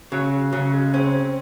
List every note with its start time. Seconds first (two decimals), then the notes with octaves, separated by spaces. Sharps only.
0.12 C#3 F#3
0.53 C#3 F#3
0.73 G#3
0.94 C4 C#4